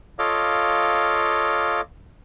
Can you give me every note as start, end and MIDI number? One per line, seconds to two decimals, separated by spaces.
0.19 1.81 65
0.19 1.81 69
0.19 1.81 73
0.19 1.81 75
0.19 1.81 77
0.19 1.81 86